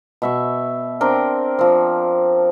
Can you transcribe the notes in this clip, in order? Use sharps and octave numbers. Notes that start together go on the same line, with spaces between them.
B2 E5 C#6
C4 D4 A#4 G5
F3 C4